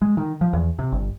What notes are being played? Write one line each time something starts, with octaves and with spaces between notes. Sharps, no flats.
G#3
D#3
F3
E2
C3
G1